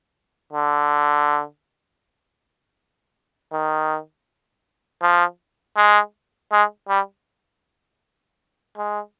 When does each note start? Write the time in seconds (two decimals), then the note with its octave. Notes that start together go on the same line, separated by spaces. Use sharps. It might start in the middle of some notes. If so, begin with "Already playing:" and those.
0.53 D3
3.52 D#3
5.02 F3
5.76 G#3
6.52 G#3
6.89 G3
8.77 G#3